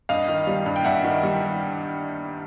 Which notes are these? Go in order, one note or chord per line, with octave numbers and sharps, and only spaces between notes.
G2 D#5 F5
D#3
G3
G2
G5
G2 E5 F#5
D#3
G3